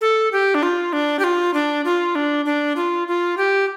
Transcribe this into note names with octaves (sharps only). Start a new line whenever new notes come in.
A4
G4
D4
F4
D4
G4
F4
D4
F4
D4
D4
F4
F4
G4